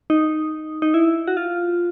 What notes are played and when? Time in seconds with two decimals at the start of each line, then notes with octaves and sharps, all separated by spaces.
0.10 D#4
0.82 D#4
0.94 E4
1.28 F#4
1.37 F4